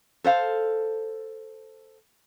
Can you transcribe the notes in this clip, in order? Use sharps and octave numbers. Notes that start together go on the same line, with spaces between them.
A4 C5 F5